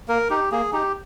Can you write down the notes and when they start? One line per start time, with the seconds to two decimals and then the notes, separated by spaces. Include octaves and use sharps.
0.08 A#3 A#4
0.30 D#4 G4
0.51 A#3 G#4
0.73 D#4 G4